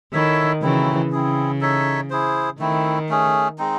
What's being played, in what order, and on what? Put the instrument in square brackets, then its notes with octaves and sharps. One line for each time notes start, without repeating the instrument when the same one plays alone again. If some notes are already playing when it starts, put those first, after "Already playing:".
[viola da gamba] D#3 [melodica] E4 A4 C#5 E5
[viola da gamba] C#3 E3 [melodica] F#3 A3 C4 E4
[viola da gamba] C#3 [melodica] C4 E4 G#4
[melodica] D#4 A4 C#5 E5
E4 G#4 C5
[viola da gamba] D#3 [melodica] A3 C4 E4
[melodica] A3 C#4 G#4
G#3 C4 D#4